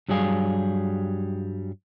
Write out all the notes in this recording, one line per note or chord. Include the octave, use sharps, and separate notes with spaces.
G2 F#3 G3 G#4 F5